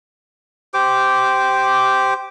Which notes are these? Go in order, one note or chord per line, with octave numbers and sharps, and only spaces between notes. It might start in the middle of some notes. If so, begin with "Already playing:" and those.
G4 C5 D6